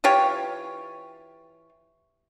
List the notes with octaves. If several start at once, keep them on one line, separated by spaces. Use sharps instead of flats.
E3 F4 G4 C#5